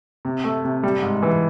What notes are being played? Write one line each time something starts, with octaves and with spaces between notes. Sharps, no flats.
C3
A3
C3
G3
G#2
E3